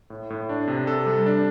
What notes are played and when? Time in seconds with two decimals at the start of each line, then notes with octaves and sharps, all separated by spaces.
0.10 A2
0.30 A2
0.49 D4
0.68 C3
0.87 A4
1.06 G3
1.26 D4